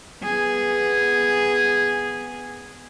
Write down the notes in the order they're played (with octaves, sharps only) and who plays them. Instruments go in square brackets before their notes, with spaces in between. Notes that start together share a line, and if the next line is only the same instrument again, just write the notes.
[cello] B3 G#4